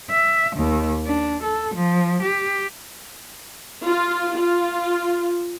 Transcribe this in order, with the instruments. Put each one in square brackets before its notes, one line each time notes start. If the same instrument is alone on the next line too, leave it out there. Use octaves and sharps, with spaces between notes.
[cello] E5
D#2
D4
A4
F3
G4
[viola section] F4
F4